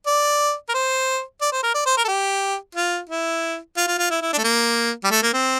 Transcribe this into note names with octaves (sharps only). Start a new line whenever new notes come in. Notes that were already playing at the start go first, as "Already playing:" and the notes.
D5
A#4
C5
D5
C5
A#4
D5
C5
A#4
A4
G4
F4
E4
F4
F4
F4
E4
E4
D4
A3
A#3
G3
A3
A#3
C4